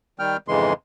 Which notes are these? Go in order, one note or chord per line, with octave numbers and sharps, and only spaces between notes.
D#3 G3 G5 F6
F2 G#2 C#3 E3 G#3 C6